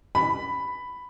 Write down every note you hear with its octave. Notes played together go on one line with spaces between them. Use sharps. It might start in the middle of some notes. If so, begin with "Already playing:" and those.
B5